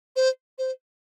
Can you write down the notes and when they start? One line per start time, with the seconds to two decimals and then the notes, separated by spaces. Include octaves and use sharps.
0.16 C5
0.58 C5